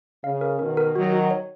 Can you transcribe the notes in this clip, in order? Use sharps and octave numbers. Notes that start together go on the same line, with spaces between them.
C#3 F5
A#4
B2 D#3 A#4
A#4
D#3 F#3 F#4
F#4
C#5